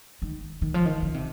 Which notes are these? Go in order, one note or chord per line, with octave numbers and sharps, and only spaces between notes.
D#3
D#3
F3
D#3
C#3
C3